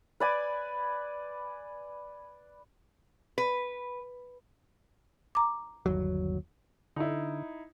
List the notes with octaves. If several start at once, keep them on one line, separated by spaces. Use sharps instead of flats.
B4 D5 G#5
B4
A#5 D6
G1 D#2 F#3
D3 D#4 E4